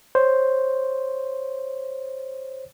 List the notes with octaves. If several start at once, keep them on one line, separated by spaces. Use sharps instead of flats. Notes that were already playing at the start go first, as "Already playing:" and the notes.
C5 C#5